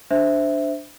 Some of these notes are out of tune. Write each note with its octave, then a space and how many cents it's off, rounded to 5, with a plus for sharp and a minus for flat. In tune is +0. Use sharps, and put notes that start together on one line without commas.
D4 +0 C5 -10 E5 +0